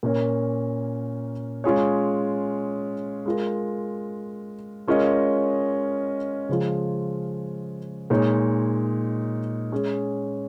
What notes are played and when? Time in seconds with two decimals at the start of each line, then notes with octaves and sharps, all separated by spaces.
0.03 A#2 A#3 C#4 A#4 C#5
1.64 G#3 C#4 F4 G#4 C#5
3.26 G#3 F4 A#4
4.88 G#3 C#4 F4 A#4 D#5
6.49 C#3 F3 G#3 F4
8.10 A#2 G#3 D#4 C#5
9.72 G#3 C#4 G#4